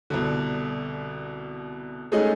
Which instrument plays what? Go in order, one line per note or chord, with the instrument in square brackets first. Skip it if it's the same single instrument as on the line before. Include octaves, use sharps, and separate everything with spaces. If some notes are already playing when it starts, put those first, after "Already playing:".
[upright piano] C2 B2 D3
G#3 A3 C#4 D#4 G#4 D#5